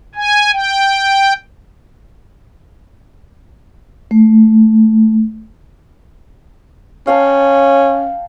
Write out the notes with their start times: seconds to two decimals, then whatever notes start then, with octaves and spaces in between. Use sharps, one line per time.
0.15 G#5
0.53 G5
4.11 A3
7.07 C#4 F5 G5 A5